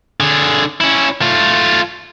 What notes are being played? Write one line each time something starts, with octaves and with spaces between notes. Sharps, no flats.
D3 G#4
C#4 E4
A3 F4